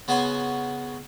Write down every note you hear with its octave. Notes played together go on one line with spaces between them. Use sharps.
C#3 B3 F#4 C#5 G#5 C6